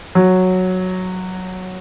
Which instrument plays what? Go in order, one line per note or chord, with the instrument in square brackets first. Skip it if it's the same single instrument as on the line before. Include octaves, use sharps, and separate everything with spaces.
[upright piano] F#3